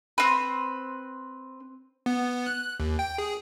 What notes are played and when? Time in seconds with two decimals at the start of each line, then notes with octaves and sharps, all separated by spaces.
0.18 C4 B4
2.06 B3
2.46 F#6
2.80 D#2
2.99 G5
3.18 G#4